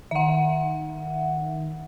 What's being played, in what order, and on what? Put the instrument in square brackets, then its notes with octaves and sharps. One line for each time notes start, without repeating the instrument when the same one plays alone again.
[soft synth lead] D#3 [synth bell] E5 F#5